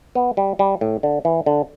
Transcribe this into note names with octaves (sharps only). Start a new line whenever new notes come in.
B3
G3
G3
A2
D3
E3
D3